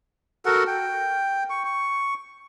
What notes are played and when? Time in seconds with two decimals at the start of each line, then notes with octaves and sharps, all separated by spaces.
0.46 F#4 A4 A#4 F#5
0.67 G5
1.50 C#6
1.65 C#6